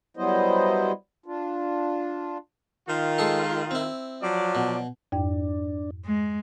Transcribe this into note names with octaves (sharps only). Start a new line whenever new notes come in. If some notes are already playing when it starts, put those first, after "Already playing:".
F#3 G3 B3 E4 C5 D#5
D4 F4
D#3 F4
G#3 G#4 A4
C4 E4
F3 F#3 D5
B2
F2 G#2 D4 G5
G#3